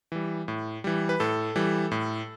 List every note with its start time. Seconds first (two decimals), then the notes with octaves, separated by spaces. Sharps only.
0.12 E3 G3
0.48 A2
0.84 E3 G3
1.09 B4
1.20 A2 A4
1.56 E3 G3
1.92 A2